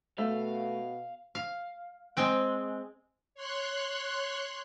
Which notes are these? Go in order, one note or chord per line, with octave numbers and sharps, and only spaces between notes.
B2 A3 F5
F5
G#3 C4 G5
C#5 C6 F#6